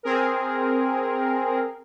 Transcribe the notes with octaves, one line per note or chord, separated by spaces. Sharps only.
C4 G#4 A#4